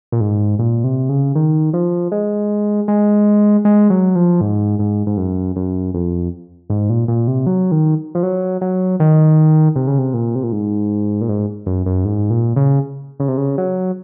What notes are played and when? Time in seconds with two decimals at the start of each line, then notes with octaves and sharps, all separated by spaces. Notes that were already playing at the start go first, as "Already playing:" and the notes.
0.12 A#2
0.21 G#2
0.59 A#2
0.84 C3
1.09 C#3
1.35 D#3
1.73 F3
2.12 G#3
2.88 G#3
3.65 G#3
3.90 F#3
4.15 F3
4.41 G#2
4.79 G#2
5.07 G#2
5.17 F#2
5.56 F#2
5.94 F2
6.70 G#2
6.90 A#2
7.08 A#2
7.27 C3
7.46 F#3
7.72 D#3
8.15 F3
8.23 F#3
8.61 F#3
9.00 D#3
9.76 C3
9.87 C#3
9.98 C3
10.14 A#2
10.35 C3
10.43 A#2
10.52 G#2
11.21 A#2
11.29 G#2
11.66 F#2
11.86 F#2
12.05 G#2
12.30 A#2
12.56 C#3
13.20 C#3
13.28 C3
13.37 C#3
13.58 F#3